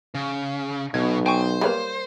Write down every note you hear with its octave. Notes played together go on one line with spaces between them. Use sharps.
C#3
B1 B2 G#6
C5 G5 G#5 C#6
G3 A3 A#3 B4 C#5 B5